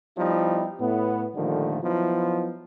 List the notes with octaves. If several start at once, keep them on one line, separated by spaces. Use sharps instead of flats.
F3 G3 B3 D#4 E4
A2 B3
A#2 D3 D#3 F3 G3 A3
F3 F#3 B3 D#4 E4